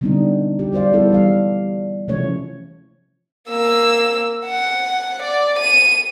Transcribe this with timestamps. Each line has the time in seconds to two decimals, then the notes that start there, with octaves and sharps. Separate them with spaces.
0.01 D3 G3 B3 C4 D4 D#4
0.59 G4
0.72 G3 F#4 C5 D5 F5
0.93 G3 B3 E4 A4
1.10 E3 G3 F5
2.08 C3 E3 F3 A3 C#4 C#5
3.49 A#3 E6
4.45 F#5
5.23 D5
5.59 D#7